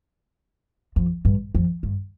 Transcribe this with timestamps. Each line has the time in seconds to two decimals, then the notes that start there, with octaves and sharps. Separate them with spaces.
0.96 F2
1.25 G2
1.55 F2
1.83 G2